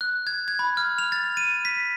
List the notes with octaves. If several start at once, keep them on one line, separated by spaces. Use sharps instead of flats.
F#6
G#6
G#6
B5
F6
F7
A6
D#7
B6